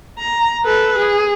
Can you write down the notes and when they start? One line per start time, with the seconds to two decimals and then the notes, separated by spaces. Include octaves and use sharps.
0.19 A#5
0.65 A4 B4
0.98 G#4